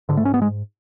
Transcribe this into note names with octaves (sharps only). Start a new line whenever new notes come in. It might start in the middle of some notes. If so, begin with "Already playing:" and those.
G#2 D3
A3
C#4
B3
G#3